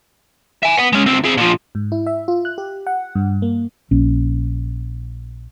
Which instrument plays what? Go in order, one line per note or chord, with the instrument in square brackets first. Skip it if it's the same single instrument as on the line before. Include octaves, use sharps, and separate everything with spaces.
[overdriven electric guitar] E5 G#5
B3
G#3 C#4
C#2 C4
C4 G#4
A#2 F3
[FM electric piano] G#2
E4
E5
F4
F#6
G4
F#5
G2
A#3
[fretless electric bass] A#1 C#4